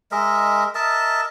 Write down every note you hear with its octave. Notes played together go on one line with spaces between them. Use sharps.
G#3 A#4 D#5 E5
A#4 D#5 E5 A5